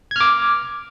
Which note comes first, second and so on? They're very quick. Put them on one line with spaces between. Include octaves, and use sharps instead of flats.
G#6 F6 D6